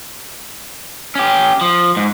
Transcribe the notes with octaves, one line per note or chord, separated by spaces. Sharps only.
C#4 G4
F3
G#2